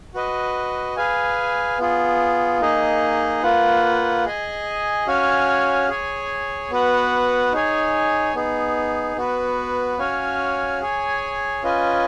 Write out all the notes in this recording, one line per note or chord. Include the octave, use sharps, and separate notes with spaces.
F#4 B4 D#5
G#4 B4 F5 G#5
B3 F4 G#4
A#3 D#4 G#4 D#5
A#3 F4 B4 F#5
G#4 D#5 G#5
C#4 F#4 C#5 F5 G#5
G#4 C#5 G#5
B3 F#4 B4 F#5
D#4 G#4 C#5 G#5
B3 D#4 G#4
B3 F#4 B4
C#4 F#4 C#5 F5 G#5
G#4 C#5 G#5
C#4 F4 B4 D#5 G#5